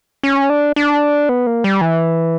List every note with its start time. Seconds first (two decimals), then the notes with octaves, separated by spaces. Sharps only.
0.23 C#4
0.50 D4
0.76 D4
1.29 B3
1.47 A#3
1.64 G3
1.81 E3